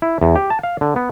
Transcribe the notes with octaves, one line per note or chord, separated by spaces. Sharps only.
E4
E2
G4
A5
F5
D3
B3